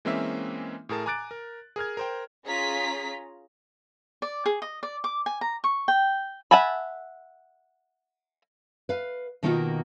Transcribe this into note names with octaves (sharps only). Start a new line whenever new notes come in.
E3 G#3 A#3 C4 C#4 E5
A2 G#4 A#4 A5
G#5 A#5 D6 F#6 A6 D7
A#4
G#4 A#4 F6 G#6
A#4 C5 G5
C#4 F4 G#4 A#5 B6
D5
G#4
D#5
D5
D6
G#5
A#5
C#6
G5
E5 F#5 G#5 A5 B5
B4 F5
B2 D#3 A#3 D#4 F4 F#4